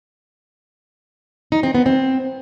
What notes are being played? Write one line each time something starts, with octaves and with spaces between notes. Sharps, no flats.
D#4
C4
B3
C4